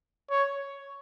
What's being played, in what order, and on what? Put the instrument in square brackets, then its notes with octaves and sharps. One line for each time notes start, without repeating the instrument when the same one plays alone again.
[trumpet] C#5